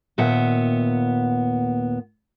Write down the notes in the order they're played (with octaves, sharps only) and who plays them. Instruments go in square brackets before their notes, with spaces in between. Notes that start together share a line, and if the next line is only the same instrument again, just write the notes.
[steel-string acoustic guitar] D#2 A#2 B3 E5 F#5